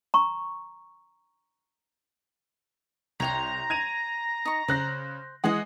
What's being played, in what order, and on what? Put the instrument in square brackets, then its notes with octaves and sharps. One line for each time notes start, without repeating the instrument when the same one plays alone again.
[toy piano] A#5 C#6
[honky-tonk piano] C2 F7 [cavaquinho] C#5 G5 C6 [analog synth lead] A#5
[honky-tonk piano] G#6 D#7 F7
[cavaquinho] D#4 C#6
[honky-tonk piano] C#3 F#6 A#6 [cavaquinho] C5
[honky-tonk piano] E3 G#3 F#5 [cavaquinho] G#4 D#5